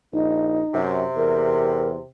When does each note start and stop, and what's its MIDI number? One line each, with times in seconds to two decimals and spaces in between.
0.13 0.61 34
0.13 0.78 63
0.74 1.03 42
0.74 2.07 48
1.16 1.98 40
1.16 1.89 70